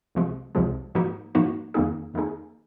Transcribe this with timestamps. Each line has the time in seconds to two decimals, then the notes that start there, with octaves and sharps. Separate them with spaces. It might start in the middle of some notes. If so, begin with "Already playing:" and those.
0.15 C2 C3 F3 G#3
0.55 C2 C3 F3 G#3
0.95 G#2 F3 A#3 D#4 F#4
1.35 G#2 F3 A#3 D#4 F#4
1.74 F2 D#3 A#3 D#4 G#4
2.14 F2 D#3 A#3 D#4 G#4